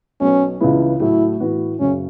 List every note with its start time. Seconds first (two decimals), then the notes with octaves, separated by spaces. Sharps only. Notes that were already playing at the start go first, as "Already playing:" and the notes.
0.21 B1 B2 B3 C#4
0.61 C#2 C#3 E3 B3 E4
1.00 A2 F#3 A3 E4 F#4
1.40 A2 E3 B3 F#4
1.80 F#1 F#2 C#3 C#4